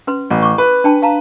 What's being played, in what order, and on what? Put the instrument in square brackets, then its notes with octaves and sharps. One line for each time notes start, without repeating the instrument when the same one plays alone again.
[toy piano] C#4 B4 C6
[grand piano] A1
[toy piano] C#6 D6
[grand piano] B4
[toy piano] D4 G5 A5
F5 A5 A#5